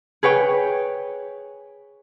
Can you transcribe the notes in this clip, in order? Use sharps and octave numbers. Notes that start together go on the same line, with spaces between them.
G#4 B4 C#5 G5